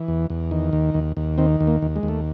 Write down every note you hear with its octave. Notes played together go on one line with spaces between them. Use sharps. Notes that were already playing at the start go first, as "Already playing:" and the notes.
Already playing: E3
E2
E2
D#3
D#2
D#2
D#2
D#3 C4
D#2
A#3
D#2
G#3
D#2
A3